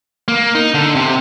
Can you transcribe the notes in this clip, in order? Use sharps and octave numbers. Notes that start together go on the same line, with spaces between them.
A#3
D#4
D3
C3